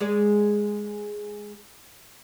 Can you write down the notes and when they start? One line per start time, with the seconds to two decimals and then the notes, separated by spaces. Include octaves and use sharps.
0.01 G#3 G#4 D5